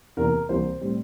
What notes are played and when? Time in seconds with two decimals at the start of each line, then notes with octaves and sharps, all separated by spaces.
0.17 E2 C3 E3 A#3 A#4
0.49 C2 C3 E3 A#3 C5
0.81 A2 G3 C4